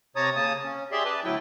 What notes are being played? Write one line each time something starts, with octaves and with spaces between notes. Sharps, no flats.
C3 C#5 A5 A#5 D#6
C#3 A#3 A5 D#6
C#4
G4 G#4 D5 E5 C6
B4 D5 A5
D2 F#3 E4 G5